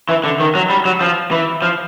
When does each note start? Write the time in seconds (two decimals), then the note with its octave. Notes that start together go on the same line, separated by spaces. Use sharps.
0.09 E3
0.24 D3
0.40 D#3
0.55 F#3
0.70 G3
0.85 F#3
1.01 F3
1.31 E3
1.62 F3